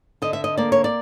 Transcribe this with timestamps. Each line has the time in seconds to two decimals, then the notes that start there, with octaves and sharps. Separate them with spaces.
0.22 D3 D#5
0.33 E5
0.44 D#5
0.58 A#3 D5
0.72 C#5
0.84 D5